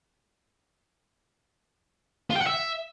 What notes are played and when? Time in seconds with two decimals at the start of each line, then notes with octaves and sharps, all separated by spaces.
2.31 F4
2.36 G5
2.41 F#5
2.47 E5